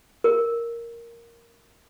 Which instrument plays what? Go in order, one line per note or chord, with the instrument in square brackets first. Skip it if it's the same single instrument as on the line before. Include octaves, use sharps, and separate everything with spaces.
[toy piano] A#4